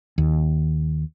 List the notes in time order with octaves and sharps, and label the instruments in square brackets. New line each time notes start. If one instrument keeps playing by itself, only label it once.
[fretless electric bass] D#2